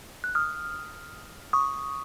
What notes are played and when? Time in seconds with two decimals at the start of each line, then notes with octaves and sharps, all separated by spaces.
0.24 F#6
0.35 D#6 F6
1.53 C#6 D#6